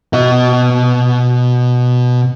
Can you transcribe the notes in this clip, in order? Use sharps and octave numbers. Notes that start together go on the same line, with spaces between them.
B2 D#5